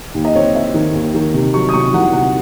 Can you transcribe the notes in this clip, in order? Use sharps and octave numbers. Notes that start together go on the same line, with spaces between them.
D#2
D#5
C4 C#5
C4 E5
D#3
D#2
D#3
C3
F#3 C#6
D#6
C3 C#6
C2 F#5
C3 F#5